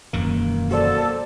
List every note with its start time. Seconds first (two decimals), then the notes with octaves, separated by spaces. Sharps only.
0.13 E1 F#2 D#3 A#3
0.71 F#4 A4 C5 D5